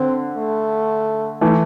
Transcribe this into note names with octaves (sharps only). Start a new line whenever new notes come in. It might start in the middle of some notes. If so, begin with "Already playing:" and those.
Already playing: D3 C4
A3
E3 A3